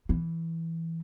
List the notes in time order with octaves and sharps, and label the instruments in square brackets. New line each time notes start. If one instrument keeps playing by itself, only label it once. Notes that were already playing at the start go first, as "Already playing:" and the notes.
[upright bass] E3